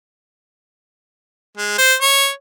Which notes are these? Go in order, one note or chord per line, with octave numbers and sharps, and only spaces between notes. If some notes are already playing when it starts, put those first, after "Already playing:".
G#3
C5
C#5